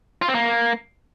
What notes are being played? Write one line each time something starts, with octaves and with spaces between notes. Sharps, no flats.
F4
C4
A#3